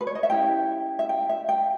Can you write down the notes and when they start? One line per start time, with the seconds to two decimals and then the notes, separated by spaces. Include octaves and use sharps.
0.01 B4
0.07 C#5
0.15 D#5
0.23 E5
0.30 C#4 E4 G4 G5
0.99 E5
1.09 G5
1.29 E5
1.49 G5